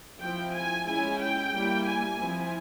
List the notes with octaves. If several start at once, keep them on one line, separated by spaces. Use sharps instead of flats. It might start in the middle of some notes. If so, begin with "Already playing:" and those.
F3 C4 E4 G5
G#5
G#3 C#4 E4 G#5
G5
G3 A#3 E4
G#5
F3 C4 E4